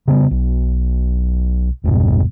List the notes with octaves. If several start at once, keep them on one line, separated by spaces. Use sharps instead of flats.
C#3 G3 B3
B1
G1 E2 G2 B2